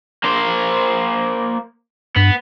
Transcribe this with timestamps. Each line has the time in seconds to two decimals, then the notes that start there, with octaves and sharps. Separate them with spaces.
0.24 A#3 C5
2.16 G2 B3